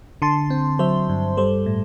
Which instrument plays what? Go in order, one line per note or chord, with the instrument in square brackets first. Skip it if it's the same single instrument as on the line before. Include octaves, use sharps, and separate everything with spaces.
[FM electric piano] D3 A5 C6
C4
F#3 C5 E5
G2
G3 A4 C5
A2